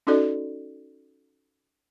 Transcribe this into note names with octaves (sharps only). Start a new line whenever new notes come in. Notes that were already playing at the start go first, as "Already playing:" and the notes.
C#4 D#4 F#4 A4 D5 D#5